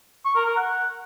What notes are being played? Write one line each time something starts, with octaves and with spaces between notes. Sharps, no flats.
C#6
A#4
A#4
F#5